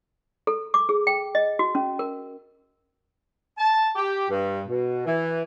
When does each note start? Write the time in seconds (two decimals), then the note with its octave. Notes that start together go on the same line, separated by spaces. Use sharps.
0.47 A4
0.74 D6
0.89 G#4
1.07 G5
1.35 D#5
1.59 F#4
1.75 C#4
1.99 A#4
3.58 A5
3.95 G4
4.30 G2
4.67 B2
5.06 E3